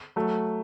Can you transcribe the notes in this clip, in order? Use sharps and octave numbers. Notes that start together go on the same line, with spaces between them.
F#3 A3